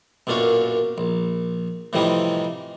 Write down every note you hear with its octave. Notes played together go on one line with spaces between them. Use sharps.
B1 F#2 A#2 D4 F5 C#6
A#1
A2 C3 E3 F3 G3 D#4